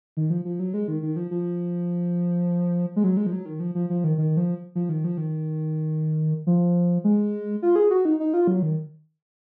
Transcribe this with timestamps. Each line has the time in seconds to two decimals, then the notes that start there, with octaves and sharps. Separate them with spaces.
0.17 D#3
0.30 F3
0.45 F3
0.60 F#3
0.74 G#3
0.88 D#3
1.03 D#3
1.16 F3
1.31 F3
2.96 G#3
3.04 F#3
3.17 G#3
3.27 F3
3.32 F#3
3.46 D#3
3.60 F3
3.75 F3
3.90 F3
4.04 D#3
4.18 D#3
4.37 F3
4.75 F3
4.89 D#3
5.04 F3
5.18 D#3
6.47 F3
7.04 G#3
7.62 F4
7.76 G#4
7.91 F#4
8.05 D#4
8.20 D#4
8.34 F4
8.47 F#3
8.62 D#3